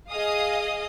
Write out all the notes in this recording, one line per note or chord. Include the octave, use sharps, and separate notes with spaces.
G#4 D#5 F5 D#6